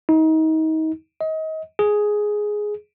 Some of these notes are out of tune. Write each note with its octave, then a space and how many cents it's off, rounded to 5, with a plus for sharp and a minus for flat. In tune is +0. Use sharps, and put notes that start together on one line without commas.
D#4 +30
D#5 +30
G#4 +5